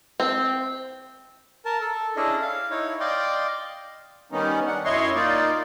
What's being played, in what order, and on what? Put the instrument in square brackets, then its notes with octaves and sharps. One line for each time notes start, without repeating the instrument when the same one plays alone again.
[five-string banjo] C4
[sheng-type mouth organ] A#4 A5
A4
C#4 D4 E4 G#4 A4 D#5
F5
D#4 E4 C#5
D5 D#5 F5 G5 C6
[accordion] D#3 G3 B3 C#4 D#4
D4 F#5
F#2 E4 C#5 D#5 C6 C#6
A#3 D#4 F4 D5